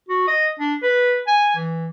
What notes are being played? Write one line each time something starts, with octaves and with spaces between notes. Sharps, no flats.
F#4
D#5
D4
B4
G#5
E3